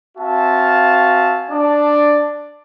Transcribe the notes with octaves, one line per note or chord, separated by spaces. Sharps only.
C4 F#4 E5 F5 G#5 A5
D4 D5 A5